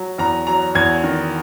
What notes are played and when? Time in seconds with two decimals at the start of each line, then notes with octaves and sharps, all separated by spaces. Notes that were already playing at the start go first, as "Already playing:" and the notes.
Already playing: F#3
0.18 E2 A#5
0.47 F#3 A#5
0.75 E2 G#6
1.04 D#3